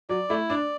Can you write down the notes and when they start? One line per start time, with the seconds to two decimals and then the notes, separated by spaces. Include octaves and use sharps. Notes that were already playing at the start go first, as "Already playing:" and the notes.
0.09 F#3 D5
0.30 A3 E4
0.50 D4 D5